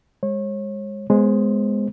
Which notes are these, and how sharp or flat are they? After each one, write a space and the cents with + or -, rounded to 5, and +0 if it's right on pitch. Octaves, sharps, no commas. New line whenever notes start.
G#3 -20 C#5 -35
G#3 +0 B3 +10 C5 +20